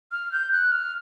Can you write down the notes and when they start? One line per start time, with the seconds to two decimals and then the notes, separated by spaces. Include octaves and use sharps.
0.12 F6
0.32 G6
0.52 F#6
0.72 F6